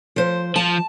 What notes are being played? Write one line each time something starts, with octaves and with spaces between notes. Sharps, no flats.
F3 C5
F3 A5